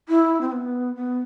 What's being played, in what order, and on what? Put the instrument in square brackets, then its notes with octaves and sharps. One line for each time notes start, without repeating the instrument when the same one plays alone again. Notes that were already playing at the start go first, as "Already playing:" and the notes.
[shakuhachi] E4
C4
B3
B3